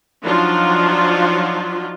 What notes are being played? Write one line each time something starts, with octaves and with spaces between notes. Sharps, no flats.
F3 F#3 D4 D#4 F4